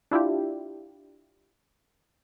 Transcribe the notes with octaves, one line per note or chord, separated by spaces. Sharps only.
D4 E4 F4 G4